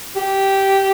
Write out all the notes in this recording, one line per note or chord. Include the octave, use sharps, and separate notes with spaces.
G4